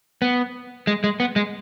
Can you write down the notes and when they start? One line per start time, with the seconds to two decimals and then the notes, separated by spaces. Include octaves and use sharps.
0.22 B3
0.87 G#3
1.04 G#3
1.20 B3
1.36 G#3